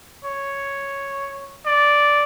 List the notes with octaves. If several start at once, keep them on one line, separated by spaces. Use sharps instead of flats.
C#5
D5